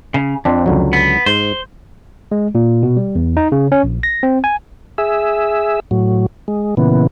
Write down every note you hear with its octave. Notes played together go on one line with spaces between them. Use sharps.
C#3
F2 F3 C4 D4
C#2 D3 F#3
B3
G#2 C5
G#3
A#2
B2
G3
E2
D#4
C#3
C#4
A#1
A#6
C4
G#5
G#4 E5
A2 F#3
G#3
A#2 C#3 E3 B3